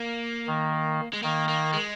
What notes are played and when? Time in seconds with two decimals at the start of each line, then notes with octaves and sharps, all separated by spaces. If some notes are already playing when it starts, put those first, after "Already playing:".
Already playing: A#3
0.47 D#3
1.13 G#3
1.23 D#3 A#3
1.49 A#3
1.73 G#3